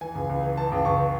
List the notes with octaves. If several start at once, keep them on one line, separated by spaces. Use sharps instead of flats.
E3 G#5
C#2
C#2
E3
E3 A5
C#2
C#2 C#6
E3